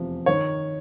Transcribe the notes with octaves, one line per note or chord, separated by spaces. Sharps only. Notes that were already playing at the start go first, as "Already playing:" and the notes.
Already playing: F1 E2 C3 F3
D#3 C#5